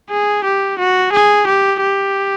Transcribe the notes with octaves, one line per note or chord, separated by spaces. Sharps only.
G#4
G4
F#4
G#4
G4
G4